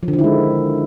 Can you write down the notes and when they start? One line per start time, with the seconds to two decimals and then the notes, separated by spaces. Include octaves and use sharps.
0.03 F3
0.08 D3
0.13 D#3
0.19 E4
0.24 G#3